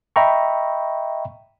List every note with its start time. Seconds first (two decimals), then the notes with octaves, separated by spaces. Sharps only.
0.16 D#5 E5 G5 A#5 B5 C#6